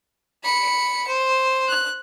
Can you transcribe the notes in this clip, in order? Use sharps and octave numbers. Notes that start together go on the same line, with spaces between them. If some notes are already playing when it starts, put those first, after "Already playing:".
B5 C#7
C5
F#6